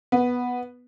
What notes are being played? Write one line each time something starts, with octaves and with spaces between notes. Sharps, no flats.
B3